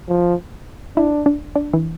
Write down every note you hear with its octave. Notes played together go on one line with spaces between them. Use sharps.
F3
D4 E4
D4
D4
E3